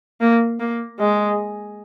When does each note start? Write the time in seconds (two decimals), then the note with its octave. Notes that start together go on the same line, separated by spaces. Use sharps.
0.21 A#3
0.60 A#3
1.00 G#3